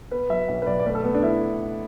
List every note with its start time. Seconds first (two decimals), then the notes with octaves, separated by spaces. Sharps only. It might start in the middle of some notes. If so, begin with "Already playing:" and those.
0.11 B3 B4
0.30 F#3 E5
0.49 B1 E5
0.62 B4
0.67 B1 D5
0.79 D5
0.86 A3 B4
0.95 A4
1.04 A3 B3
1.14 D4
1.23 A3 E4